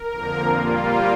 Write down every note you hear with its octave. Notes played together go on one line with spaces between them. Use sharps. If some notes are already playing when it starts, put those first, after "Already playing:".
Already playing: A#4
F2 D3 F3 A#3
A#2 G3 A#3 F4